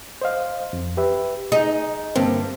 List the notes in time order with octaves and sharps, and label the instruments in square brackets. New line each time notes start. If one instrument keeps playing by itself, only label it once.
[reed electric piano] C5 D#5 F5
F2
G4 B4 E5
[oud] D#4 [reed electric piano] G#4
[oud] G2 [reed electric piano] D3 A#3 C4